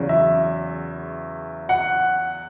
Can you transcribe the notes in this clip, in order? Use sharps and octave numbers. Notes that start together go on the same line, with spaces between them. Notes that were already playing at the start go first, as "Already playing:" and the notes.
Already playing: E2 C#3 F#3
E5
F#5